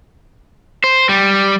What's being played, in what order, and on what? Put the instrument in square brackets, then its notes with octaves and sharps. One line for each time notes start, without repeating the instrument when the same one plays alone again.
[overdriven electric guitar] C5
G3